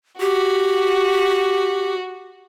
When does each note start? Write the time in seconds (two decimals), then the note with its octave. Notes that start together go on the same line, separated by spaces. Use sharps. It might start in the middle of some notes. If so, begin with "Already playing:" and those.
0.20 F#4 G4